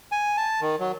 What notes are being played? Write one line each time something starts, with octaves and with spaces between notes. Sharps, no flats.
G#5
A5
D#3
F#3